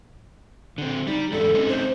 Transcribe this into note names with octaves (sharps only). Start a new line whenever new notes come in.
D3 C4
G3 D#4
E2 G#2 G3 A4
C4 C#4 D#4
C5